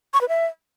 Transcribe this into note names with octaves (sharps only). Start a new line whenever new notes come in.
C#6
B4
E5